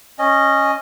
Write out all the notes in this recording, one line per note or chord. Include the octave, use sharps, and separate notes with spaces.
C#4 D#5